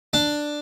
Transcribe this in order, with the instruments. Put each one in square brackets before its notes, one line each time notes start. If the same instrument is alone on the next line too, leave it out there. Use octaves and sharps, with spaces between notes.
[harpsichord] D4